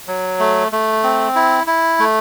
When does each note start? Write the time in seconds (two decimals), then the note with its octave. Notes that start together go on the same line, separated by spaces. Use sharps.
0.07 F#3
0.39 A3
0.72 A3
1.03 C4
1.35 E4
1.67 E4
1.99 A3